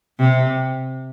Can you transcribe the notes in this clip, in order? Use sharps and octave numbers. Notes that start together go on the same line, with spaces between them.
C3